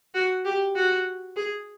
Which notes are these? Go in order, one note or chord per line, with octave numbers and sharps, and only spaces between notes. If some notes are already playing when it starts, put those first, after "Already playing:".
F#4
G4
F#4
G#4